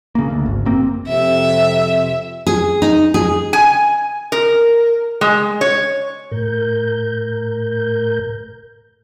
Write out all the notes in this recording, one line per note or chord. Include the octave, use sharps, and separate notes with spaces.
C#3 A#3
D2
G#1
F#1 A#3 C4
F2 C3 E5
G#4
D#4
G#4
G#5
A#4
G#3
C#5
A2 A#4 G6